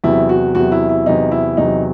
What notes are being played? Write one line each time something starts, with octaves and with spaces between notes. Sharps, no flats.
E2 C3 F#3 E4
F#4
E2 C3 F#3 F#4
E4
E4
E2 C3 F#3 D#4
E4
E2 C3 F#3 D#4